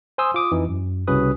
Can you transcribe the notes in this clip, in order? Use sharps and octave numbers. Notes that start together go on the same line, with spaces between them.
C5 G#5 C6 D#6 E6
F4 D6 D#6
F2 E3 D#4
F#2
C2 C#3 C#4 F#4 B4 D#6